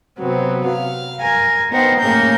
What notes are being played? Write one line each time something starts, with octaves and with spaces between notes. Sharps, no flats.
C3 F#3 B3 C4
F5
A#4 G#5
B3 D#4 A#4 C5 F#5 G5
A2 C#3 A#3 A4 A#4 G6